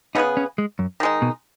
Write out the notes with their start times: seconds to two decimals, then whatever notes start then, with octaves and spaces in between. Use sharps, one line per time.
0.15 C#3 B3 D#4 G#4 B4
0.37 C#4
0.58 G#3
0.79 F#2
1.00 D#3 G#3 D#4
1.22 B2